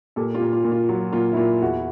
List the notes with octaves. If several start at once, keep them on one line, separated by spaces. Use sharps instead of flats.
A#2 G4 A4
F4 G4
A#2
F4
A#2
F4
F#3 F4
A#2 F4
E4
A#2 F4
E2 E4 F#4